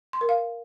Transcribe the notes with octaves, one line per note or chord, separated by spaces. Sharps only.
C6
A#4
F5